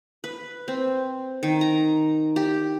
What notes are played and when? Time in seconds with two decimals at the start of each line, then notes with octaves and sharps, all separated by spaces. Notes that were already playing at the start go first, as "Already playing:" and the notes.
0.24 B4
0.68 C4
1.43 D#3
1.61 A#5
2.36 G4